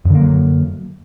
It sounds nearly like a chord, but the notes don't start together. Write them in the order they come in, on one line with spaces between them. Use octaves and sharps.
F#2 D3 A#3 F#3